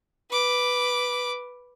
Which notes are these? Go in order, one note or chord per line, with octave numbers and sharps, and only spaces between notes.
B4 D6